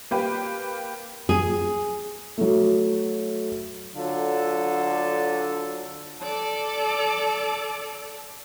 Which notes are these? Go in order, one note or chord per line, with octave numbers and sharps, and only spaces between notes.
A#3 G4 B4 G5
G#4
F#3 A3
D3 F#3 F4 A4
A4 D5